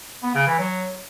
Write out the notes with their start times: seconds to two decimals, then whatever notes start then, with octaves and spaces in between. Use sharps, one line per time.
0.23 B3
0.35 C#3
0.47 E3
0.59 F#3